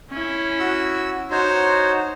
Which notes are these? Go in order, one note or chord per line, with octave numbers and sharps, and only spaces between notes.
C#4 E4
F#4 E6
D#4 F#4 C5 C#5